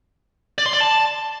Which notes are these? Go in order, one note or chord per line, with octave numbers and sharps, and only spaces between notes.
D5
C6
D5
A5